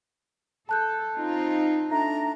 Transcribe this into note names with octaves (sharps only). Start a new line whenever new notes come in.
A4 A5 F#6 G6
C4 D#4 F4
A3 D4 A#5